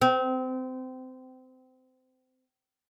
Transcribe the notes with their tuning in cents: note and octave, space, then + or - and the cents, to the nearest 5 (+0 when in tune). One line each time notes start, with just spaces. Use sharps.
C4 -25